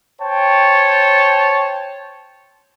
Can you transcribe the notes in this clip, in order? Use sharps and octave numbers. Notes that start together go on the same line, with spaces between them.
C5 C#5 G5 A5